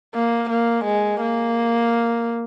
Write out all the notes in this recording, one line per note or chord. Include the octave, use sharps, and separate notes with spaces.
A#3
A#3
G#3
A#3